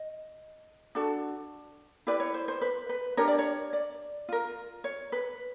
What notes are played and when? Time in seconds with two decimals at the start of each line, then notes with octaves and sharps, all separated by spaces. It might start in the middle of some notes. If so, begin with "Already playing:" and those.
Already playing: D#5
0.95 D4 F#4 A4
2.07 E4 G4 B4 D5
2.20 C#5
2.34 C5
2.48 C5
2.61 B4
2.89 B4
3.17 D4 G4 A#4 C#5
3.28 D5
3.38 C#5
3.73 D5
4.29 F4 A#4
4.84 C#5
5.12 B4